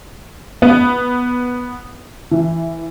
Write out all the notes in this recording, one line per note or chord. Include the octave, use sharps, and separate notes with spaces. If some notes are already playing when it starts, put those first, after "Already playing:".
B3
E3